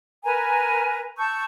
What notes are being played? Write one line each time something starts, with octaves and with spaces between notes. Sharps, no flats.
A#4 B4 G#5 A#5
A5 C#6 E6 G6